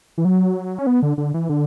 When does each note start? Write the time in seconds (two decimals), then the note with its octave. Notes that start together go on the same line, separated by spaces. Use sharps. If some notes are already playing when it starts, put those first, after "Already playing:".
0.18 E3
0.25 F#3
0.79 C#4
0.87 B3
1.03 D3
1.18 D3
1.34 E3
1.49 D3